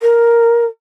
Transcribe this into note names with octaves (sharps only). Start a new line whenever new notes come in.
A#4